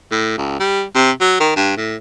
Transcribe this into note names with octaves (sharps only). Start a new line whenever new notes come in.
A2
C#2
G3
C3
F#3
D#3
G2
A2